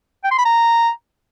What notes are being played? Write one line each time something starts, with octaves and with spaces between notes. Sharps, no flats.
G5
C6
B5
A#5